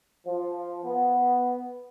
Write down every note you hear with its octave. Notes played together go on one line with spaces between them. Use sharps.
F3
B3